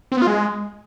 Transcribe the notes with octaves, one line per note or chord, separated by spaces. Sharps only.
C4
B3
F4
G#3